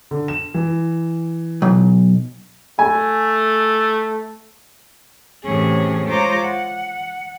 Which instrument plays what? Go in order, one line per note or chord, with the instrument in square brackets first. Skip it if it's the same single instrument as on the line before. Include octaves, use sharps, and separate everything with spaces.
[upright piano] D3
E7
E3
[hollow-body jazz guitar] B1
[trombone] A3 [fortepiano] G#5
[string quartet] A2 C3 E3 C#4 G#4
G#3 F4 C5 C#5 A#5 D6
F#5